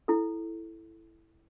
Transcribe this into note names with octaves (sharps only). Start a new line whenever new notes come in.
E4 A4